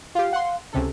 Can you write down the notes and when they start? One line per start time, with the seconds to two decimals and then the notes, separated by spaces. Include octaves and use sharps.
0.15 F4 G4 F5
0.33 F#5 C6
0.73 C#2 C3 C#4 A4